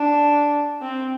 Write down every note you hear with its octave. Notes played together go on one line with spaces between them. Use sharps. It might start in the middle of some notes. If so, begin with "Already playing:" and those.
Already playing: D4
C4